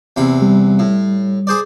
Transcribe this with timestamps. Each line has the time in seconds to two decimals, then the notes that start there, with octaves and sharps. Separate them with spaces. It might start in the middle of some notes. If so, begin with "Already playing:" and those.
0.16 E2 C3 B5
0.42 G3
0.79 A2
1.47 G#4 C5 D5